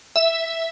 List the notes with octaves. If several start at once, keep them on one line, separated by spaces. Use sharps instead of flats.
E5